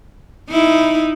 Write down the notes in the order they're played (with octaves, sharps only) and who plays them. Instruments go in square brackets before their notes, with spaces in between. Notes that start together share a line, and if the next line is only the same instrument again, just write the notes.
[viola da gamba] D#4 E4